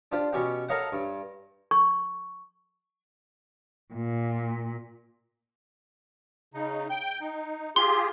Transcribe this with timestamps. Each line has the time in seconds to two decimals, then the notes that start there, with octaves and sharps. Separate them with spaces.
0.12 D4 F4 G4 C5
0.33 B2 C#4 G4 G5
0.69 A4 A#4 C#5 D#5 F5 F#5
0.92 G2
1.71 C#6
3.94 A#2
6.54 C#3 D#4
6.90 G5 G6
7.21 D#4
7.76 F4 G4 G#4 C6